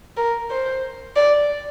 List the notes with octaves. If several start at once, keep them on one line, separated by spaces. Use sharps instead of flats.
A#4
C5
D5